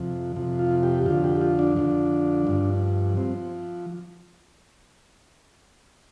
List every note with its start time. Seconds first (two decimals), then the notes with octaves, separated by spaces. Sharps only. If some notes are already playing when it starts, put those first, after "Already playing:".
Already playing: F2 C3 F3
0.36 F2 C3 F3
0.59 F4
0.83 G4
1.06 F2 D3 F3 F4
1.24 G4
1.41 F4
1.59 D4
1.76 F2 D3 F3
2.47 G2 F3
3.17 F3 C4